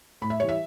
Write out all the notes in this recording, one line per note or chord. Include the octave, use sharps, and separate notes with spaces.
A2 B5
E5
E3 G3 C#5
E5